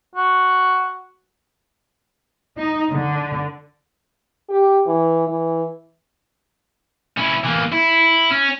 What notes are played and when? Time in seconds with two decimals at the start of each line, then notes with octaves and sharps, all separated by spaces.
0.15 F#4
2.58 D#4
2.93 D3
4.49 G4
4.87 E3
5.27 E3
7.17 C#4 E4
7.44 E3 A#3
7.72 E4
8.31 C#4